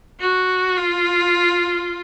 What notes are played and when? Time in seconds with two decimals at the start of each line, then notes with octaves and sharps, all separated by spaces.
0.20 F#4
0.77 F4